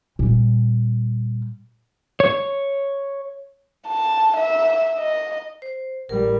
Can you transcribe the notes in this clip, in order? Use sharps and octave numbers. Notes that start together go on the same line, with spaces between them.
A#2 G3
C#5
A5
E5
D#5
C5
A1 G3 A#4